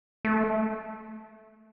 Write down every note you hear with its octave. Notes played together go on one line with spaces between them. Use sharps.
A3